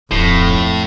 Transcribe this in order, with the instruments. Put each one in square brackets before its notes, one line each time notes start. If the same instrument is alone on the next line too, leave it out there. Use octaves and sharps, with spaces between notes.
[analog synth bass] D1 [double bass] F2 [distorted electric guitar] A2